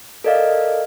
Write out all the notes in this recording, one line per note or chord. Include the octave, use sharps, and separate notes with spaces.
A4 A#4 D5 D#5 F5